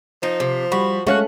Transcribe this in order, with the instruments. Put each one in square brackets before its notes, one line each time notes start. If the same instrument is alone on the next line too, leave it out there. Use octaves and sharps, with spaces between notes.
[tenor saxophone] F3 [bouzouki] D#4
[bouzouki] C3
[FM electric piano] G3 B5 [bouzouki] F#4
[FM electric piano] G#3 F5 F#6 [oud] A3 C#4 [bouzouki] F#4